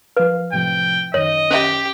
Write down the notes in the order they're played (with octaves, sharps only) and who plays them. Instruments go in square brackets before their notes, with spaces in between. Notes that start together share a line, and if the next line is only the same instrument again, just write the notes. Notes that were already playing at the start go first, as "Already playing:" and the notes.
[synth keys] F3 F5 [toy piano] B4
[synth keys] A2 C3 F3 [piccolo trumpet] G5
[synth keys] F#2 D#3 [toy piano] C#5 [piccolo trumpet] D#5
[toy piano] C#4 E5 [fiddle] G4